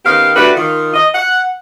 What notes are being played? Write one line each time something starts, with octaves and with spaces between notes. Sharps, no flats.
D#3 B3 C#4 G4 F5
A3 D4 F#4 G4 B4
D#3 F4
D#5
F#5